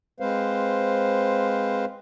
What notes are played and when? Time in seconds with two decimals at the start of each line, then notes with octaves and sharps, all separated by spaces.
0.20 G#3 C4 B4 C5 F5